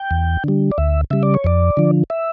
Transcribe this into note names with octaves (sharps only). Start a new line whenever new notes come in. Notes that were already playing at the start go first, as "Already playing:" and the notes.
Already playing: G5
E2
D3 G3
D5
D2 E5
C#3 G3 E5
D5
C#5
F2 D5
D3 F3
E5